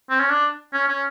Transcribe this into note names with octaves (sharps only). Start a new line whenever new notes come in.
C4
C#4
D4
C#4
C#4